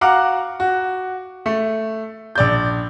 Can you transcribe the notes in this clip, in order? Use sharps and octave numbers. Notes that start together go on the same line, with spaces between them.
F#4 F5 F#5 A#5 D6
F#4
A3
A#1 D5 G6